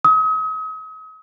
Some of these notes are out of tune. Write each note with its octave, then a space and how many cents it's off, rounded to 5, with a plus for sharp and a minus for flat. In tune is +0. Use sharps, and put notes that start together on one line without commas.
D#6 +40